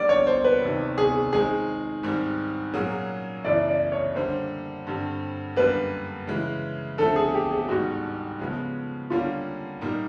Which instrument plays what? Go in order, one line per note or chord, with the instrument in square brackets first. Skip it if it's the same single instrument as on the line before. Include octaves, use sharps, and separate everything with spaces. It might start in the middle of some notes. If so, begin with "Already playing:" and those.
Already playing: [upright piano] D3 G3 A#3 [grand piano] D5
[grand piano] C#5
C5
B4
[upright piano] F2 C3 D#3
[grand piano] G#4
[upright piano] D#3 G#3 C4 D#4 [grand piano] G#4
[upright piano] G#2 D#3 G3 C4
[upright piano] A#2 F#3 A#3 C#4 F#4 [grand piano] G#4
[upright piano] F#2 C#3 E3 A3 [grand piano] D5
[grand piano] D5
C#5
[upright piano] D3 G3 A#3 [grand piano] C5
[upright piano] G2 D3 G3 C4
[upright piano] F#2 D3 G3 A#3 [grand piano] B4
[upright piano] C#3 E3 G#3
[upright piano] D3 F3 A3 C4 [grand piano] A4
[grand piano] G#4
G4
G#4
[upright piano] G#2 D#3 G3 [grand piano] F#4
[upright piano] C#3 F3 G#3 B3
[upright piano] D3 G3 A#3 C#4 [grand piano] F4
[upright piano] A#2 G3 A#3 D#4